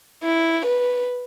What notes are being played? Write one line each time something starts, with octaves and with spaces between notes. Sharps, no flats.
E4
B4